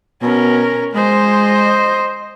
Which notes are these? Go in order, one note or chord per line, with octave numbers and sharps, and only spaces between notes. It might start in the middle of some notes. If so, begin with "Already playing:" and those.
B2 C#4 A#4
G#3 C5 D#5